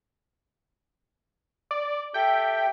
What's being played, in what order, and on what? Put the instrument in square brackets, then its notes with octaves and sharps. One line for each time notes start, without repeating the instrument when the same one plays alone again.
[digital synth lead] D5
[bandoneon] G4 A4 E5 [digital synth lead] G5